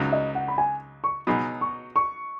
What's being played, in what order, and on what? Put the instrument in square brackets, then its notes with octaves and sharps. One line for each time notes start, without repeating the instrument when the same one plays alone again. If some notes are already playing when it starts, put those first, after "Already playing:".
Already playing: [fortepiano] C#2 C#3 F#3 D#4
[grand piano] D#5
F#5
B5
G#5
C#6
[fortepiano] B2 F#3 D#4 G#4 [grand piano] B5
[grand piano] C#6
C#6